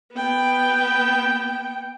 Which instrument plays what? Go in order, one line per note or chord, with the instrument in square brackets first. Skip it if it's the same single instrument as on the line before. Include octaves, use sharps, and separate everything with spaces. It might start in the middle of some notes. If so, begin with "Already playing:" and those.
[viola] B3 G5